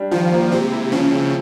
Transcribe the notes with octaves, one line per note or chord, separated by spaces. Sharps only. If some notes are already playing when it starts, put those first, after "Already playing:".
Already playing: G3 D4
D#3 F3
A#3
C3 G#3
E4
C#3 F3
C4